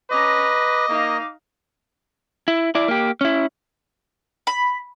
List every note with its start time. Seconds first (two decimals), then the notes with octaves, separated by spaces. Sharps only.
0.11 C#4 B4 D#5 A#5 D6
0.43 A#5
0.89 A#3 D#4 F5
2.48 E4
2.75 E4 D5
2.88 A#3 G4
3.21 C#4 E4
4.47 B5